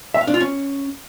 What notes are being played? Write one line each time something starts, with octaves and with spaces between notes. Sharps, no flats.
E5
F5
D4
F4
C#4